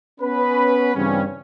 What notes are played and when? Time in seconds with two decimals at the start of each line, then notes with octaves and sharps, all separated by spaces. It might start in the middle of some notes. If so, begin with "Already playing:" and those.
0.20 B3 C#4 B4
0.95 G2 C#3 E3 G3 C4 C#4